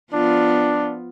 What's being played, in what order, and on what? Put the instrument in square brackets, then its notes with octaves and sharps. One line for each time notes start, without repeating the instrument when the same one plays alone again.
[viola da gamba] F3 B3 F4 [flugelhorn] D4